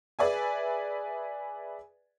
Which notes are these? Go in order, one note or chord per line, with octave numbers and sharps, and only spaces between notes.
G#4 B4 D5 E5 G#5